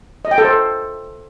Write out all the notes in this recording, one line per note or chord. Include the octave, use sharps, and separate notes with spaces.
D#5
G5
A4
C5